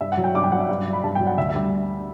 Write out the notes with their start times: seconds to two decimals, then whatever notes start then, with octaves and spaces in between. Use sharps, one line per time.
0.01 G2 E5
0.12 F#5
0.17 F#3
0.24 G5
0.34 G2 D6
0.43 G5
0.52 F#3 F#5
0.60 E5
0.69 G2
0.86 F#3
0.93 B5
1.03 G2 A5
1.15 F#3 G5
1.27 F#5
1.38 D2 E5
1.49 E5
1.55 G3